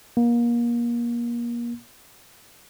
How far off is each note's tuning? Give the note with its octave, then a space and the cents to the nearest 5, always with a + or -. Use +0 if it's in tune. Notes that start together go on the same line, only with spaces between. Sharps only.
A#3 +30